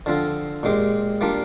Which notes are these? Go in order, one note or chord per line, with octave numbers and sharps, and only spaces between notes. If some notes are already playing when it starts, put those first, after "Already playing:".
D3 F3 C4 F4
A#2 G#3 C4 G4
G3 A#3 D4 F4